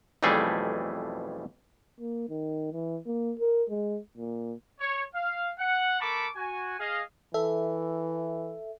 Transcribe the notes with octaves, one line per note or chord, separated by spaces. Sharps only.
B1 F2 E3 G3 A3 G#4
A#3
D#3
E3
A#3
A#4
G#3
A#2
C#5
F5
F#5
A3 A#4 A5 B5 C#6 D6
F#4 G#5
G#4 D#5 F5
E3 A4 E5